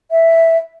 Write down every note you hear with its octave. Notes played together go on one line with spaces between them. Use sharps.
E5